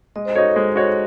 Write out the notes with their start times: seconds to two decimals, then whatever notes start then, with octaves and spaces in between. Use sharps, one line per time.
0.16 G#3 D#5
0.25 C5
0.35 D#4 F#4 A4 C#5
0.46 A4
0.56 G#3
0.76 D#4 F#4 C#5